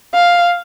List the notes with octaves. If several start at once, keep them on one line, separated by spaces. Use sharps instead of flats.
F5